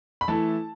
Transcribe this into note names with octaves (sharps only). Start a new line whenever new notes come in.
B5
E3 A3 E4 A5